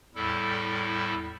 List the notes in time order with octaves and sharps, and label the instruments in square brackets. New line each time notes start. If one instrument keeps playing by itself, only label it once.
[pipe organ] E2 A2 G3 E4 A4